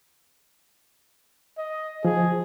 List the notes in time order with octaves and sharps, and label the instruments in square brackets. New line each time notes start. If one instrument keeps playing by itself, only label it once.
[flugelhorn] D#5
[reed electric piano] F3 [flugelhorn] G#4